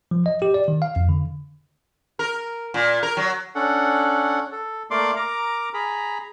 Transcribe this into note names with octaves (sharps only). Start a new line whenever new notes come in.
F3
D#5
G4
D5
D#3
F5
F2
D3
A#4
A#2
A#4
F#3
C#4 D4 A4 F#5
A4
A3 A#3 D5 F5 C6 D6
A#4 A#5 D6
G#4 A#5 B5